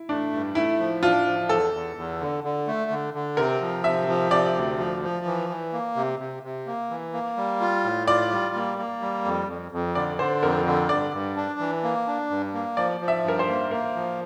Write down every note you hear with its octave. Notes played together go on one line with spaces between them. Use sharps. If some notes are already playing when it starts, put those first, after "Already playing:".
Already playing: E4
A3 D4
G2
A3 E4
F3
D4 F4
F3
E2 A4
E2
E2
D3
D3
A3
D3
D3
C3 A#4
F3
C3 E5
F3
C3 D5
D2
F3
F3
E3
E3
A#3
C3
C3
C3
A#3
E3
A#3
G3
F4
A2
F4 D5
G3
A#3
A#3
G3
F2
F2
F2
D3 D5
D3 C5
F2 A#4
D3
G2 D5
G2
D4
E3
A#3
D4
G2
A#3
F3 D5
F3
E5
G2 A#4
C5
A#3
A#3 A#4
F3